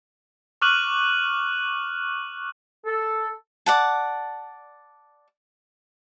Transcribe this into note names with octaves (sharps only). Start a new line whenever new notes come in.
C#6 D6 F6 F#6 D#7 F#7
A4
D5 F#5 A5